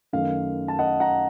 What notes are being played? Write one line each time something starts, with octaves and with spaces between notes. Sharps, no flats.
F#2 D#3 A3 F5
A5
D#5 F#5
F#5 A#5